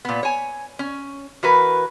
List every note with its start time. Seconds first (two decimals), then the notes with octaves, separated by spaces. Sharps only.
0.05 A#2 B3
0.23 C#5 G#5
0.79 C#4
1.43 E3 F#4 A#4 B4